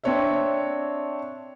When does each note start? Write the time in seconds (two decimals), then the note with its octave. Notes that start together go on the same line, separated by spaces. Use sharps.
0.04 C4 D4 C#5 D5 E5